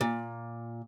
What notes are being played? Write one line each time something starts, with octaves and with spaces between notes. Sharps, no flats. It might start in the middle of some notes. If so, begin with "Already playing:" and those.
A#2